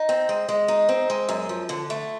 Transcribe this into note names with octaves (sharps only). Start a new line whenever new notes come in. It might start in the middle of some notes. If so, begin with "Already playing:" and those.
Already playing: D#4
C4
G#3
G#3
D#4
C4
G#3
F#2
F3
D3
A3